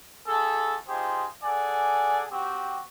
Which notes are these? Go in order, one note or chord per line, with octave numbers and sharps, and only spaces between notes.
E4 F#4 G#4 A4
D#4 F4 G4 G#4 C5
G#4 A4 D5 F#5 G#5
C4 F#4 G4